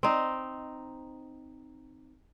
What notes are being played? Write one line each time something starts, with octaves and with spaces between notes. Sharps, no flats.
C4 D#4